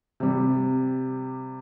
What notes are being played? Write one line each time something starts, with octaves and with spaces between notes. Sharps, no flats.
C3 G3